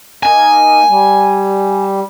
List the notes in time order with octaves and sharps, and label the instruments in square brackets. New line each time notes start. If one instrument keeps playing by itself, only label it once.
[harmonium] A#3 D#4 [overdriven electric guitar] G#5
[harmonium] G3